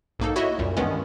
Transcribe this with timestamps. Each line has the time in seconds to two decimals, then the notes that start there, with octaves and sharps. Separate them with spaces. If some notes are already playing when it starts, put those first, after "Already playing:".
0.19 B1 G#2 A#3 D#4 A4
0.36 E4 F#4 C#5 D#5 E5
0.59 C2 F#2 A#2
0.77 G2 D#3 E3 G#3 B3 C#4